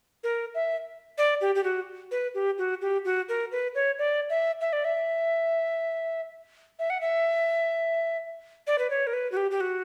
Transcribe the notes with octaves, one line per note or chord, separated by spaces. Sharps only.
A#4
E5
D5
G4
G4
F#4
B4
G4
F#4
G4
F#4
A#4
B4
C#5
D5
E5
E5
D5
E5
E5
F#5
E5
D5
B4
C#5
A#4
B4
F#4
G4
G4
F#4